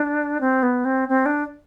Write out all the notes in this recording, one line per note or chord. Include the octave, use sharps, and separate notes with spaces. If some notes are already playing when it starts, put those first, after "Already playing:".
Already playing: D4
C4
B3
C4
C4
D4